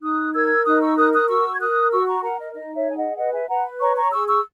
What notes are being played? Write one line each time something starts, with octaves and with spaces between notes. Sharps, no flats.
D#4 D#6 F#6
A#4 E6 G#6
D#4 D#6 F#6
C#6 E6
A#4 D#6 F#6
D#6 F#6
F#4 C#6 E6
G#6
A#4 D#6 F#6
F#4 C#6 E6
A#5 C#6
A#4 F#5 A#5
D#5
D#4 D#5
C#5 E5
G#4 G#5
D#5 F#5
B4 D#5 F#5
E5 G#5
B4 F#5 A#5
C#5 A#5 C#6
A#5 C#6
G#4 C#6 E6
C#6 E6